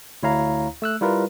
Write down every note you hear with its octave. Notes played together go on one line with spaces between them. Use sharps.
D2 E4 C#5 F5 A#5
A3 E6 F#6
G3 E4 F4 A#4 B4